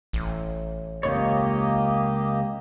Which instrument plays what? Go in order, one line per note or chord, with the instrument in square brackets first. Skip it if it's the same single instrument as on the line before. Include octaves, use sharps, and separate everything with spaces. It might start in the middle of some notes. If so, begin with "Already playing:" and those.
[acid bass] A1
[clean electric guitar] C#2 A#2 C#5 [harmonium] A#3 G4 D#5